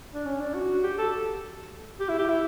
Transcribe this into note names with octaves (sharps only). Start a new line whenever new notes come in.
D4
C#4
D4
F#4
G4
A4
G4
E4
G4
E4